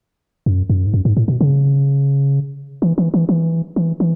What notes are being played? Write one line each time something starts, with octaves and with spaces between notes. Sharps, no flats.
F#2
F#2
G#2
F#2
G#2
A2
B2
C#3
E3
E3
E3
E3
E3
E3